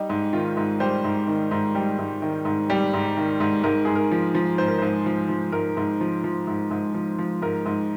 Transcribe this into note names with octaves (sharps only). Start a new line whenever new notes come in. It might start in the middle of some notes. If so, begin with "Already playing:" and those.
Already playing: G3 D#4
G#2
D#3 F4
G#2
G3 C5
G#2
D#3
G#2
G3
G#2
D#3
G#2
G3
G#2
D#3
G#2
G#2 A#4
G#2 G#4
A#4
F3
F3
G#2 C5
A#4
C5
G#2
F3
F3
G#2 A#4
G#2
F3
F3
G#2
G#2
F3
F3
G#2 A#4
G#2